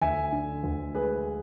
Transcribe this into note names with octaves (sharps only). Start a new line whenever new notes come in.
D2 E5 G#5
D3
D2
G#3 G#4 B4